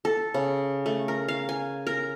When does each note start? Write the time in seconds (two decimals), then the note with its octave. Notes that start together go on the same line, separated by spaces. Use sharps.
0.05 A4
0.34 C#3
0.86 A3
1.08 A#4
1.28 F5
1.49 G#5
1.87 A#4